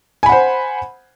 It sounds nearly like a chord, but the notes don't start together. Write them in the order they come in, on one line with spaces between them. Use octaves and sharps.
G#5 B5 F#5 C5